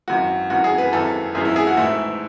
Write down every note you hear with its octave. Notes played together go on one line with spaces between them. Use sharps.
G#1 F#2 E3 F#4
G#1 F#2 E3 F#4
G#4
B4
G#1 F#2 E3 A4
G#1 F#2 E3 G#4
E4
G#4
F#4
A1 G#2 E3 A3 E4